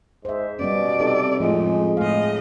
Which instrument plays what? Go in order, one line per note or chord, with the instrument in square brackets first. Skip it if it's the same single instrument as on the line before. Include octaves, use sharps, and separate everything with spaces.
[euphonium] G#2 [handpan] C5 E5
[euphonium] B2 [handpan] G3 B3 C#4 [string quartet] D5
[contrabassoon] C3 [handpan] C4 D#4 A4
[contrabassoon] F2 [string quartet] A2 [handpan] F3 [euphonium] G#3
[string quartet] A2 D#5 [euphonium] G#3 [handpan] A3 F5